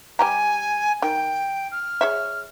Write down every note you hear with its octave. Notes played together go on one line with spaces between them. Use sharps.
G3 G4 G#5 A#5
D#3 G5
F6
G#4 C#5 E5